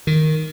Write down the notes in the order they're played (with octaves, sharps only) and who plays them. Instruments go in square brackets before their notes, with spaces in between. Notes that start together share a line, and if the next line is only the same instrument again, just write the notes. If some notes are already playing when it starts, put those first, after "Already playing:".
[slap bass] D#3